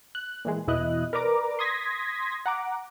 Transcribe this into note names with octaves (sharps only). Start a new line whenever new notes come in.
F#6
A#2 E3 G#3
E2 B2 E4 D#5 F#6
A#4 B4 D5 A#5 D6
C6 D#6 G#6 A#6 B6
F#5 A#5 D6